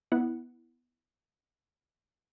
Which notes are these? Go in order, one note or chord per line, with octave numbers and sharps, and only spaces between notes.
B3 E4 F#5